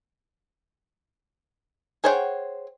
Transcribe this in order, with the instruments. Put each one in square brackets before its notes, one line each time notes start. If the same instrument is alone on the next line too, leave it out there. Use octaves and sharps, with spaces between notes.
[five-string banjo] G#4 C5 C#5 F#5 G5